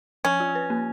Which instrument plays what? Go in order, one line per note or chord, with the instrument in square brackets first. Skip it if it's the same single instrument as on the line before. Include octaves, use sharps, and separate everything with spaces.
[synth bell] F3 [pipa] C#4
[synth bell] F4
B4
A#3